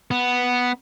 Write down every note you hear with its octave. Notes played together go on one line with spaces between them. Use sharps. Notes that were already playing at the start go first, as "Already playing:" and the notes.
B3